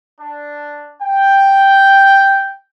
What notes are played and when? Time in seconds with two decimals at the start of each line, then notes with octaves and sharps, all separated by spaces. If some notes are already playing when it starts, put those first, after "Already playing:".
0.20 D4
1.02 G5